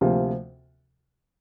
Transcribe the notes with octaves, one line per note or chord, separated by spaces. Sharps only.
D2 C3 F3 A#3